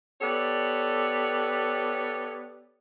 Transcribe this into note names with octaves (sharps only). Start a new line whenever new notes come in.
B3 G4 A4 C#5 D5